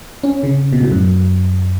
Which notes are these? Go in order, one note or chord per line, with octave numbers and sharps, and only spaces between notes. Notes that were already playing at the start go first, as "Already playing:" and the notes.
C#4
C#3
B2
A2
F#2